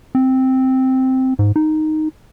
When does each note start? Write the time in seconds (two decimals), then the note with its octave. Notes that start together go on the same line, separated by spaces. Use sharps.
0.15 C4
1.39 G#2
1.56 D#4